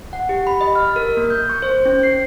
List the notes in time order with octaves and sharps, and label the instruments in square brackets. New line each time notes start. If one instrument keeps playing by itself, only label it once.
[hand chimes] F#5
G4
B5
D#5
F6
A#4
A#3
G6
C#6
C5
C#4
C7